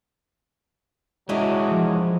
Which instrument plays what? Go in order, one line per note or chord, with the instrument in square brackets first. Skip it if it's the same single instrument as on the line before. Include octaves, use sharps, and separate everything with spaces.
[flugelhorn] F#3 [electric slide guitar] G#3 D4 E4 [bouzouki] C#4 G#4 D#5
[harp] F3